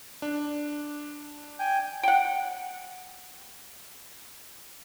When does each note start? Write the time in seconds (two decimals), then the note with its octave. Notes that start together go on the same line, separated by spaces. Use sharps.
0.22 D4
1.59 G5 G#5 G6
2.03 F#5 G5